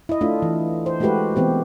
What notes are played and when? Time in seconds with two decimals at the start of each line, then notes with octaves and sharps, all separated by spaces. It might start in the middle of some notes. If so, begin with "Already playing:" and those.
0.09 E4 D#5
0.21 A3 D4 F4
0.42 E3
0.86 C5
1.00 G#3 A3 E4 F#4 G4 B4
1.36 E3 B3 C4 G4